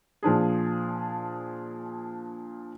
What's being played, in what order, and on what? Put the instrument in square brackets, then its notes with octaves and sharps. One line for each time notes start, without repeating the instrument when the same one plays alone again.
[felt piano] A#2 F3 D4 G#4